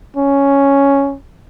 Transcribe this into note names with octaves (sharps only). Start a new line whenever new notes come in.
C#4